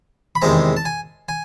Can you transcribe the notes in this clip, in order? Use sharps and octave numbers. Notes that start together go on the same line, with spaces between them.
B5
E2 C3 D#3 G#3 C4 A#5
A5
G#5
G#5